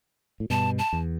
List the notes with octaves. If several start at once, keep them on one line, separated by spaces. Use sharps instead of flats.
A2
G2 B2 A5
A5
E2